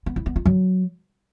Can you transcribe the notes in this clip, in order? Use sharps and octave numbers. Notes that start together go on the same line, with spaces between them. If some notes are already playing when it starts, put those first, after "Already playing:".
B3
E4
B3
F4
F#3